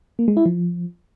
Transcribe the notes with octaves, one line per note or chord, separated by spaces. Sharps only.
A#3
G#3
E4
F3